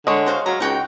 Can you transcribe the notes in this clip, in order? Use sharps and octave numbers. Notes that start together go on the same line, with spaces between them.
D3 G#3 C#5
F#4 C5 F5
F#3 F5 A#5
C#2 D#4 F#4 G5